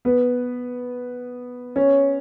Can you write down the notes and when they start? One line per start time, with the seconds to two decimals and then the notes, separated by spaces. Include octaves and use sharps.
0.05 B3 B4
1.76 C#4 C#5